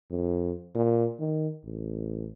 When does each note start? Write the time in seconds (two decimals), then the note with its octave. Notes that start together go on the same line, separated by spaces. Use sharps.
0.10 F2
0.75 A#2
1.20 D#3
1.64 A1